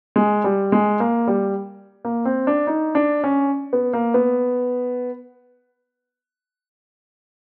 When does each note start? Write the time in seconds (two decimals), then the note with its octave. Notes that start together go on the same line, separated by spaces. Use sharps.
0.16 G#3
0.44 G3
0.72 G#3
1.00 A#3
1.27 G3
2.05 A#3
2.25 C4
2.47 D4
2.67 D#4
2.95 D4
3.24 C#4
3.73 B3
3.93 A#3
4.14 B3